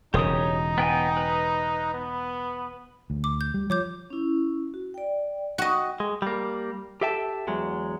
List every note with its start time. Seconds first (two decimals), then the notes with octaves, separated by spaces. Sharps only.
0.14 E1 C#3 D#4 G4 C#5 D#6
0.78 B3 G5 G#5
1.17 B4
1.94 B3
3.10 D2
3.24 D6
3.41 G6
3.54 G3
3.70 F3 C#5 D6 G6
4.10 C#4 E4
4.74 F#4
4.94 D5 G5
5.58 F#4 D#5 G5
6.00 G#3
6.22 G3 A#3
7.01 G4 A4 E5 G5 A5
7.47 E2 F#3 G#3